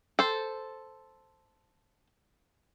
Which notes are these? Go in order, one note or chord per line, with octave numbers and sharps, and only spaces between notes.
A4 C5